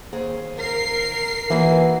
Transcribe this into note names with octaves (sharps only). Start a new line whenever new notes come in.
D#2 G#4 C5
A#4 C7
E3 A#3 D#4 F#4